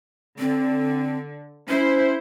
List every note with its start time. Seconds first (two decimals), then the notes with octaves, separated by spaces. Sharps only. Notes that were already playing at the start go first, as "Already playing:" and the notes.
0.39 D3 C4
1.68 C#4 E4 C5